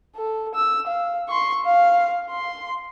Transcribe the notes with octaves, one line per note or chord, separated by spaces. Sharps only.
A4
E6
F5
C6 C#6
F5
C6